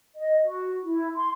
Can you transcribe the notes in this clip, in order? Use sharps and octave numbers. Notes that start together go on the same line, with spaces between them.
D#5
F#4
E4
C6